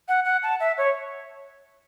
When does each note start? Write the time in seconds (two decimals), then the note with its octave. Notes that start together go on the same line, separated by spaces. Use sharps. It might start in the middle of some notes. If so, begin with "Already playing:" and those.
0.08 F#5
0.25 F#5
0.43 A5
0.60 E5
0.78 C#5